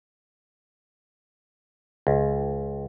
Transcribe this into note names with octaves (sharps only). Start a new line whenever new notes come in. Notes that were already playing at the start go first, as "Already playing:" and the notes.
C#2